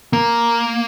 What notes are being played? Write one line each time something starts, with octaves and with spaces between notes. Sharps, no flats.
A#3